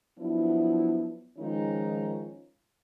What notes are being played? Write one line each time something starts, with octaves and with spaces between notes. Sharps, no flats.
F3 F#3 B3 D4 E4
D#3 F3 G#3 C#4 D#4 F4